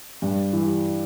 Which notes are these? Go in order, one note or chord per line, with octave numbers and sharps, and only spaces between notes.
G2
E3 G3